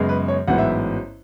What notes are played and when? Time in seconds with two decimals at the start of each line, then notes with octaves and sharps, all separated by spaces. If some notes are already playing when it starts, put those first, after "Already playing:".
Already playing: F#2 C#3 G#3 B3
0.09 B4
0.28 C#5
0.48 A1 G#2 F#3 B3 F#5
0.58 E5